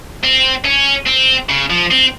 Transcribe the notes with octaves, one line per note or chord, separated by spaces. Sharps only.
C4
C#4
C4
C#3
F3
C4